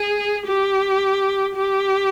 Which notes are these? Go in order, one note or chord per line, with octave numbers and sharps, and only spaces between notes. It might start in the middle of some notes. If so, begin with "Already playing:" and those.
Already playing: G#4
G4
G4